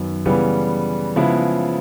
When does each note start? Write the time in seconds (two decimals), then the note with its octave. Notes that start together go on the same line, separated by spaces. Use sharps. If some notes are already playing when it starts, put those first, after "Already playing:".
Already playing: F#2 D#3 F#3 B3
0.26 C#3 E3 G3 B3
1.16 C#3 F3 G#3 B3 E4